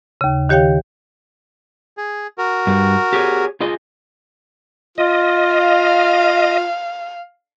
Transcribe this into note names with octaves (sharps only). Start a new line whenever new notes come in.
D#2 C#3
D#3 G4 C#5 F5 G5
G#4
F#4 A#4
G2 G3
G4 G#4 C#5
F4 G#4 D#5
F4 D#5
F5